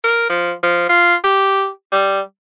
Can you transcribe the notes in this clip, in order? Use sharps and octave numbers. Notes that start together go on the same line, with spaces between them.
A#4
F3
F3
F4
G4
G3